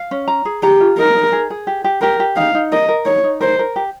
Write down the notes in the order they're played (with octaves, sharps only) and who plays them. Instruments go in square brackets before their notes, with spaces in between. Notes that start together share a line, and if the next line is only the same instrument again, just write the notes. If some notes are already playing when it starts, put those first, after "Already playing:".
Already playing: [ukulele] F5
C#4
A#5
G#4
[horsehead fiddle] G4 [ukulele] A#5
[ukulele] F4
[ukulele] D#4 [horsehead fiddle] A#4
[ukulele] D#4
G#4
G#4
G4
G4
[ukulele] G4 [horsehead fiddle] A#4
[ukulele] G4
[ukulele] D#4 [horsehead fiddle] F5
[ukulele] D#4
[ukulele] A#4 [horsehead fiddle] D#5
[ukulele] A#4
[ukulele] D#4 [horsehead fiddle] C#5
[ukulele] D#4
[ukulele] A#4 [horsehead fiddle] C5
[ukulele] A#4
G4